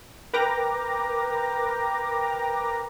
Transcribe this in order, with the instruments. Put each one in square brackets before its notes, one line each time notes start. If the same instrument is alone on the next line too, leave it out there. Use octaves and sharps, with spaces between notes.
[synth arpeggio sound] A#4 B4 G5 A#5 D6 A#6